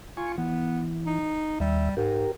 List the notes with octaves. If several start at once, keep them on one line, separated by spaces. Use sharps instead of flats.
F4 G#5 C#6
E3 B3
D#4
D#2 G3 E5
G#2 G4 A#4